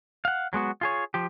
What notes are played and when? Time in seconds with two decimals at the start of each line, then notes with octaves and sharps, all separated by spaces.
0.25 F5 F#5
0.53 F#3 G#3 B3 F#4
0.81 F4 G#4 C#5
1.14 F3 G4